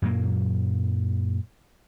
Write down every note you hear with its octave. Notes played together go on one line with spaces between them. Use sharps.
F#2 A#2 F#3 A#3